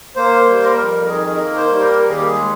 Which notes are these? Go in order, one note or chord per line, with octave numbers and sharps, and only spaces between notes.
A#3 C5
G3
A#4
F2
A#4
D#3 G#4
A#4
A#3
C5
G3
A#4
D#2 A#4
G#4
G4
G#4
G#3